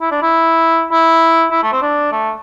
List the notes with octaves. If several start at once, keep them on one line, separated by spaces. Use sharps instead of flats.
E4
D4
E4
E4
E4
A3
C4
D4
A3